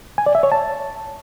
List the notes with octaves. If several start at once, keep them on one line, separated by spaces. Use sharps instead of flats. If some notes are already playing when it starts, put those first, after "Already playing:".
G#5
D5
E5
C#5
A5